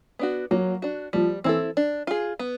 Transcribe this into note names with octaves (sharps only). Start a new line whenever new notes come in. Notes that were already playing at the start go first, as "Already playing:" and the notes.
B3 D4 F#4
F#3 A#3
D4 F#4
F3 G3
E3 C4 E4 A4
D4
F4 G#4
B3